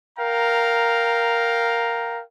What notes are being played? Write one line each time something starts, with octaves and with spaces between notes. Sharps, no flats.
A#4 F5 G5 A#5